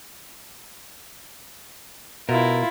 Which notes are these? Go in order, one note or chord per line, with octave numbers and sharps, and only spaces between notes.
B2 E4 F4 A#4